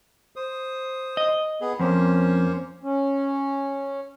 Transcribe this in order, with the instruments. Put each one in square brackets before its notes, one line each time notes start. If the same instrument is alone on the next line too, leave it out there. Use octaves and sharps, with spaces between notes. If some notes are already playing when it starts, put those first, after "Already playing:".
[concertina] C5 D#6
[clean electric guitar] D#5
[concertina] B3 G#4
[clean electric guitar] F2 [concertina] A#3 C#4 C5
[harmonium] C#4